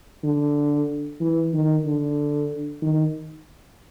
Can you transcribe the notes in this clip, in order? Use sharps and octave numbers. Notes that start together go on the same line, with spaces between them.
D3
E3
D#3
D3
D#3